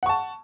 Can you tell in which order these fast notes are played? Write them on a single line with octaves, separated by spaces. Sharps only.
F#5 C#6 A5